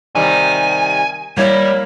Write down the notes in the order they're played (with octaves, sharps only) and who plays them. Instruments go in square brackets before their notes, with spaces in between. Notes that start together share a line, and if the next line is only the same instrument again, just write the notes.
[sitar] C3 D#3 G3 [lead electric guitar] G#5
[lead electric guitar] G3 [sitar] A#3 E4 [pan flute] C#5